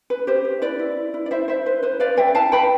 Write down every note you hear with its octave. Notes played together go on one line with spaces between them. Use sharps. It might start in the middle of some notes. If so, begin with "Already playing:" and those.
B4
G4 C5
G4
E4 B4 D5
E4
E4
E4
D5
E4 C5 E5
E4 C5 E5
B4 C5
B4 C5
B4 D5 F5
B4 E5 G5
E4 F5 A5
B4 G5 B5